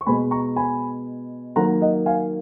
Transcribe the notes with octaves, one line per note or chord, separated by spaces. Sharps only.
C#6
B2 G#3 G#5 B5
A#5 C#6
G#5 B5
D#3 F#3 A#3 F#5 A#5
D#5 F#5
F5 G#5